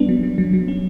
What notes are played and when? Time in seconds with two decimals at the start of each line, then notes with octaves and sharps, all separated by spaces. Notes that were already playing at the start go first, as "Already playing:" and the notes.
Already playing: G3 B3 D4
0.09 F#3
0.23 F#3
0.38 F#3
0.53 F#3
0.68 C#4